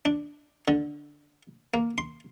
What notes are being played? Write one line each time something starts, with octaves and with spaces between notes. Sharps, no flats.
D4
D3
A#3
C6